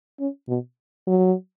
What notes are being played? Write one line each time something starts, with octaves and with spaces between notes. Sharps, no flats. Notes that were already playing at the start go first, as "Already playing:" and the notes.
C#4
B2
F#3